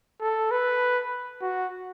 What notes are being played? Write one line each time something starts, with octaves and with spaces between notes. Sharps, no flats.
A4
B4
F#4